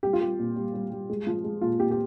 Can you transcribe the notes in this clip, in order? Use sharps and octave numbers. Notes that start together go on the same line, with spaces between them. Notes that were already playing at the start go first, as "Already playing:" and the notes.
G3 G4
F4
G3 G4
A#2
G3
G3
G3
G#3
F3
G#3
A#2 F4
A#2 G4
G4